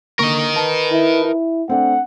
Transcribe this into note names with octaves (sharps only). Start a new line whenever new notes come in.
D3 A#3 A#4 D#5 C#6
B4 A5
E4
E4
A3 C4 D4 F#5